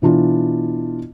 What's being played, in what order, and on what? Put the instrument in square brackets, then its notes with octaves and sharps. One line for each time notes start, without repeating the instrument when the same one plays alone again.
[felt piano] B2 E3 D4 F4